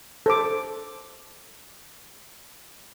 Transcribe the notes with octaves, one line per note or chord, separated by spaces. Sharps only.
A4 C5 D6